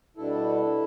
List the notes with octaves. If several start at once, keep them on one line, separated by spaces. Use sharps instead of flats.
B2 G3 D4 E4 A4